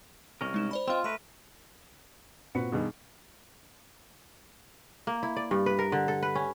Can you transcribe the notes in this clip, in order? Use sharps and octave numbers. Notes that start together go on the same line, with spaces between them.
C2 C#4 A#4
G#3 D#4 E7
C5 D5 B5
C4 F4 C5 D#5
A3 A#4 B4 C6
A#2 C4 F#4 B4 C#7
G2 B2 D#3 G#4
A#3
E4
D5
G2
B4
A#4
D3
A4
B4
C#4